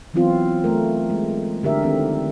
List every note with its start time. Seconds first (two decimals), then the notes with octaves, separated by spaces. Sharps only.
0.14 E3 F#3 B3 C4 F4
0.64 A3 A#4
1.10 G#3
1.63 D3 G4 A#4 E5
1.83 D#3 C4 G4